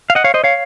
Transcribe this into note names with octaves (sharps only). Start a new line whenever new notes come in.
F5
D#5 F#5
C#5 F5
C5 D#5
C#5 F5